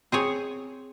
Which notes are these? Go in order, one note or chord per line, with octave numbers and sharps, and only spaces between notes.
C4 G#4 C#5